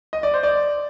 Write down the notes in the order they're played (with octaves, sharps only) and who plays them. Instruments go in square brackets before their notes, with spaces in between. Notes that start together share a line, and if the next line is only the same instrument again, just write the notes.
[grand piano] D#5
D5
C5
D5